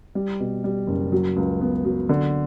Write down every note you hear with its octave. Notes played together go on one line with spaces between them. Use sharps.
G3
B2
G3
F#1
F#3
C#2
B3
F#3
D3